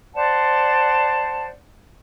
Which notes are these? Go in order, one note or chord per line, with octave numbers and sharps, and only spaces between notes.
C5 D5 F#5 A5